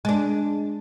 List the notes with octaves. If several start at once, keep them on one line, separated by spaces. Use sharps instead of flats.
G#3 D4